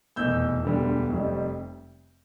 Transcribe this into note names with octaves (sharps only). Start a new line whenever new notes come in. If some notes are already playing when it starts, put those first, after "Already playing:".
F1 E2 B2 E6 G6
E1 D2 D3 G3 B3
F1 F2 C3 G3